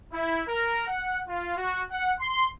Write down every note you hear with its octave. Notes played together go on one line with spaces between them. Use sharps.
E4
A#4
F#5
F4
F#4
F#5
C6